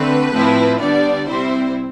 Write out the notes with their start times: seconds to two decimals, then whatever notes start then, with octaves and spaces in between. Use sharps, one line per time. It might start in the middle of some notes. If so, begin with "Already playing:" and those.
Already playing: D3 A3 C4 B4
0.33 A2 F3 C4 E4
0.80 D3 G3 B3 D4 D5
1.26 C3 G3 C4 E4 C5